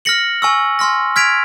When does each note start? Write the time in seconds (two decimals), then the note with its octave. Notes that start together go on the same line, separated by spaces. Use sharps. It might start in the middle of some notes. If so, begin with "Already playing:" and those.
0.05 F6 A#6 C#7 F#7
0.42 G#5 C#6 E6
0.79 G#5 C6 F6 A#6
1.16 F6 G#6 B6 D7 F7